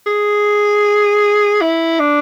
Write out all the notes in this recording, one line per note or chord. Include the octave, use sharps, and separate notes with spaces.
G#4
E4
D4